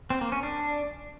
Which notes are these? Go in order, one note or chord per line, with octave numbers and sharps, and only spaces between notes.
C4
A#3
C#4
D4